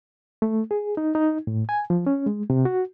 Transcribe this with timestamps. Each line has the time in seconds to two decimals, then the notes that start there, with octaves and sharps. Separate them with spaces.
0.42 A3
0.71 G#4
0.97 D#4
1.15 D#4
1.47 A2
1.69 G#5
1.90 F3
2.07 C#4
2.26 G#3
2.50 C3
2.65 F#4